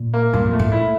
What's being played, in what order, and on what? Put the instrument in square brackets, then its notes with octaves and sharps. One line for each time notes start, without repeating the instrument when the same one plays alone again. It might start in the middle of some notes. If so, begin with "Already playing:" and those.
Already playing: [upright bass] A#2
[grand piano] A#3
[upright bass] G2 [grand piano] A#2
[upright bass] F2
[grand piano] A3
[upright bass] A2
[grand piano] E4